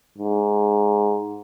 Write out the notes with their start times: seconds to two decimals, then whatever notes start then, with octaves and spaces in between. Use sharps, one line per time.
0.18 G#2